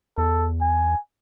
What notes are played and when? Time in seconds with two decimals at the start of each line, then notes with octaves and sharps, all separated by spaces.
0.18 E2 A4
0.61 G#5